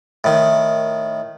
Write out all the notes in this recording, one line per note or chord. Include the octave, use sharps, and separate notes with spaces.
A2 D#3